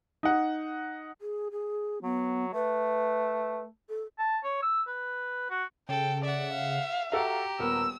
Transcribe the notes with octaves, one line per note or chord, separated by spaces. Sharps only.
D#4 F#5
G#4
G#4
F#3 B3
A3 B4
A4
A5
C#5
E6
B4
F#4
C#3 A4 G5
D5 E5 F#5
F5
F#4 G4 A4 E5 A#5
D#1 B3 A#4 E6